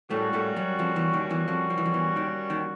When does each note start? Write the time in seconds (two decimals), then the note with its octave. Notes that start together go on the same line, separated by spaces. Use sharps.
0.10 A2 G3 A3 A#3 C#4 F#4
0.33 A2 A3
0.56 F#2 F#3
0.79 F2 F3
0.96 E2 E3
1.13 D#2 D#3
1.31 E2 E3
1.48 F2 F3
1.70 F3
1.78 E3
1.86 F2 F3
1.94 E2 E3
2.16 D#2 D#3
2.50 D#2 D#3